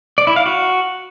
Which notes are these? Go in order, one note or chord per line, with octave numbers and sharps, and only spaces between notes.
D5
E4
F5
F#4